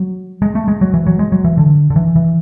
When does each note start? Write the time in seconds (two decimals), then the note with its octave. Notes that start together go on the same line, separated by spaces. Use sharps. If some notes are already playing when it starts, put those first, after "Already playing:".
Already playing: F#3
0.42 G#3
0.55 A3
0.68 G#3
0.81 F#3
0.94 E3
1.07 F#3
1.19 G#3
1.32 F#3
1.44 E3
1.58 D3
1.90 D3
1.96 E3
2.16 E3